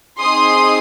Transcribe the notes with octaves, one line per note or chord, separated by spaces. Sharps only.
C4 D#4 G#4 C6 D#6